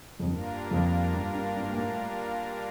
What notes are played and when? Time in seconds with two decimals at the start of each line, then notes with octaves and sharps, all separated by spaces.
0.19 F2
0.28 G2 G3 A#3 D4 F4 A#4
0.71 F2
1.13 G2
1.34 G2
1.56 G2
1.69 A#2
1.77 A2